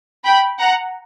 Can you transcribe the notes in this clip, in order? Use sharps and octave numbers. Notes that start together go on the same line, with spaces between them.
G5 B5
F#5 A#5